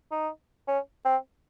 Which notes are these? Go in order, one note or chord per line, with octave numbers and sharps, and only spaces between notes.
D#4
C#4
C4